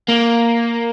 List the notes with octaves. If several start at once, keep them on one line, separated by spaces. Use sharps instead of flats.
A#3